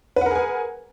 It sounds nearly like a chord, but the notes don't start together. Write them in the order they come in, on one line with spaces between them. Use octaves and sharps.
B4 F#5 A#4 G#4 G#5